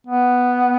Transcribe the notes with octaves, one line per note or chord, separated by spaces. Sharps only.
B3